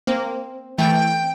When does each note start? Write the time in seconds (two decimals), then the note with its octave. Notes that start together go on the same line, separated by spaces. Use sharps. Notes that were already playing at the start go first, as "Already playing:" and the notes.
0.07 A#3 C4
0.78 E3 A3 G5